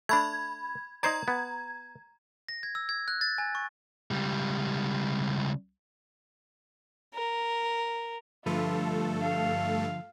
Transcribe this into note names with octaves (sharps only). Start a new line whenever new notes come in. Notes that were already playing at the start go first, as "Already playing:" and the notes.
A3 D4 B5 G#6
D#4 C5 D5 A#5 G#6
B3
A#6
G#6
E6
G#6
F#6
A6
G#5
C#6
C#2 G3
A#4
G2 D3 F3 A3 F4 A4 B4
F5